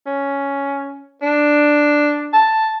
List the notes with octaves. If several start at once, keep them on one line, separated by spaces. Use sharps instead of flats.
C#4
D4
A5